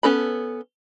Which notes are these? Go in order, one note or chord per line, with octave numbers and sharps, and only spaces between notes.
B3 C#4 A4 B5